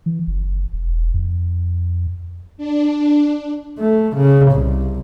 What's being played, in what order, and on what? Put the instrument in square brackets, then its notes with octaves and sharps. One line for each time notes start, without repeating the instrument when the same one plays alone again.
[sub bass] E3
F#1
E1
F2
[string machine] D4
[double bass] A3
C#3
C2